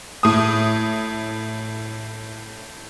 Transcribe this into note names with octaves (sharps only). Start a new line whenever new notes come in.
A2 D#6